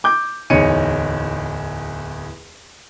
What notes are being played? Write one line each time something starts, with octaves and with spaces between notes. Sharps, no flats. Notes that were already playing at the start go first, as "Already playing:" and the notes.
D6 G6
D1 E2 D#4 C#5 C#7 D#7